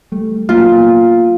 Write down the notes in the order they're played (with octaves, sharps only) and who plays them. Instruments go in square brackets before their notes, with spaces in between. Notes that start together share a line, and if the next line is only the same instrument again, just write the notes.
[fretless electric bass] G3 A3
[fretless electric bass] F#3 A#3 B3 [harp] F4